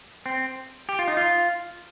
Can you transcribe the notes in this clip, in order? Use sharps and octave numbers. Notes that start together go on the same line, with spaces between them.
C4
G4
F4
D#4
F4